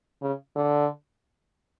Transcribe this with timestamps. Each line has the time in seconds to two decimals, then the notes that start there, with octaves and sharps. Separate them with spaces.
0.21 C#3
0.55 D3